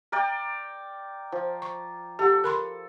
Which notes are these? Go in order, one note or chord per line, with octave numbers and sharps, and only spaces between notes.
A#4 D5 G5
F3
C#6
G4 A4 F#5
A#4 B5 C6